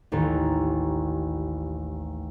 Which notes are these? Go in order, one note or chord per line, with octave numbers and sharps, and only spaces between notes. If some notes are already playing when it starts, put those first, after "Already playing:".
A1 D#2 A4